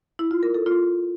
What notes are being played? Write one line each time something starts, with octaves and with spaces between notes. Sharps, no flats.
E4
F4
A#4
A4
F4